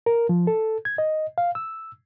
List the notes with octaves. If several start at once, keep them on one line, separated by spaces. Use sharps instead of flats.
A#4
F3
A4
G#6
D#5
F5
E6